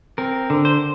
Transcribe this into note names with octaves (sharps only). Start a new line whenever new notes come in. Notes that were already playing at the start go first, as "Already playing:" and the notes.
C4 A#4
D3
C5